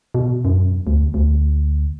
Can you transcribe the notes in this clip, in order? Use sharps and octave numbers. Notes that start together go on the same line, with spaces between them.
B2
F#2
D2
D2